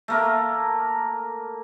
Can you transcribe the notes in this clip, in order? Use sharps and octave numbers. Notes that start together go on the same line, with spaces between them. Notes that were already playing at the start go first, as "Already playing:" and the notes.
A3 A#3 A#4